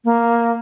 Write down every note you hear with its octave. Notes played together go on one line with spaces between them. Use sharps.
A#3